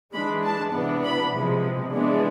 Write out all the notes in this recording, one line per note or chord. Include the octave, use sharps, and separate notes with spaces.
E3 G#3 D4 B5
A5
C3 E3 B3 D4
B5
C3 F3 G#3
E3 G#3 B3 D4